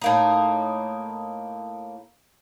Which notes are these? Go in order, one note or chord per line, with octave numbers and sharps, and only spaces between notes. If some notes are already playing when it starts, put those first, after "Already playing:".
A2 A#3 D#4